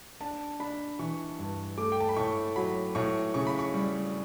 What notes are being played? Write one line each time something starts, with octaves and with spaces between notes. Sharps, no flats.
D4 A5
D4 B5
E3 C#6
G2
A3 D6
G5
A5
B5
A2 C#6
F#3 B5
A2 C#6
C#3 C#6
B5
C#6
G3